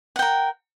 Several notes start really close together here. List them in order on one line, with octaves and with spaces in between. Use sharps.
F#5 G5 A#4